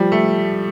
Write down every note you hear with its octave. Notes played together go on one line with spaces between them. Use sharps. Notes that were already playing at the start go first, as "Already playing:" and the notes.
Already playing: F3 G3
A3